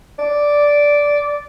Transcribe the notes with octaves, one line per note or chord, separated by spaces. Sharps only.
D5